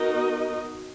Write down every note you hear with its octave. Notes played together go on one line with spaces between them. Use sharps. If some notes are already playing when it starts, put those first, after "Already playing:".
Already playing: B3 D#4 F#4 A#4 D#5